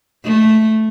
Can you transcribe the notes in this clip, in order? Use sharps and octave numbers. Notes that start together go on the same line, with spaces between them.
A3